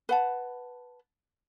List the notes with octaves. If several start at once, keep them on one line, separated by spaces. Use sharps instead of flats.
B4 F#5 A5